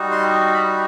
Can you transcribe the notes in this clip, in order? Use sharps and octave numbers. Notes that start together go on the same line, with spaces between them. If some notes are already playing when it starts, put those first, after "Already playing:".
Already playing: G3 D#4 F#4
C6
B5